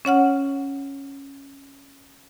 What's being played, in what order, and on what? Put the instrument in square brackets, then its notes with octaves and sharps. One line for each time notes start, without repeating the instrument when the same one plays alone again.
[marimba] C#4 C#5 F#5 F6